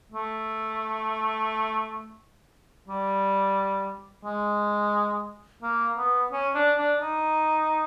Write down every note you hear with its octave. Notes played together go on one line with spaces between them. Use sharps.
A3
G3
G#3
A#3
B3
C#4
D4
D4
D#4